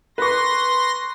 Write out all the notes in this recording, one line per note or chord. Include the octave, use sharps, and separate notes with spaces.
B4 C6 C#6 A#6